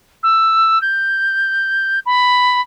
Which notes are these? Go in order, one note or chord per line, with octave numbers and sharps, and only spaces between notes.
E6
G6
B5